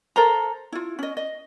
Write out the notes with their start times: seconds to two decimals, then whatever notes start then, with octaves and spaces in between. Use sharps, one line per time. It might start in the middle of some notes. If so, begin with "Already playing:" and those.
0.16 A4 A#4 C5 A#5
0.72 E4 F4
0.99 C#4 D#5
1.17 D#5